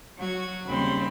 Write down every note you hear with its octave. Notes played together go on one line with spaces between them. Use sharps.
F#3 F#4 G#6
D#2 C#3 G3 C4 B5 C6